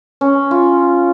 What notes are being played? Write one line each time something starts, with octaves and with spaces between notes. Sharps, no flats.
C#4
F4